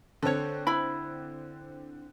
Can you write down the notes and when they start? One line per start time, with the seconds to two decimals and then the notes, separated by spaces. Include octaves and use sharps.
0.23 D3 C4 A4 C#5
0.67 E4 B5